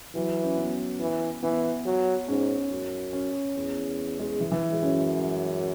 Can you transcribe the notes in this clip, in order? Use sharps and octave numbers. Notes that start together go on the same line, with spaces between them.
E3 F#3
C#4
B3
E3
E3 B3
F#3
G#2 C#4
F#2
C#4
E2
G#3
E3
E3
G#3
F#2 C#4